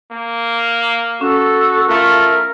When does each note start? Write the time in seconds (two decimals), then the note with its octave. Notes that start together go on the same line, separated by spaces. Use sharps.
0.12 A#3
1.21 C#4 F#4 A4
1.89 A3 F4 A#4